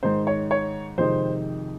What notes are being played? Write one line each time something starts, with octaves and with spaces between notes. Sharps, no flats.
G#2 D#3 G#3 D#4 C5
C#5
C#5
F2 C3 D#3 G#3 D#4 C5